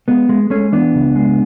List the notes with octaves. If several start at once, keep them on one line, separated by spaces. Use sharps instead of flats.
G#3 B3
G#3
G#3 A3 C#4
E3 B3 D4
C#2
G#3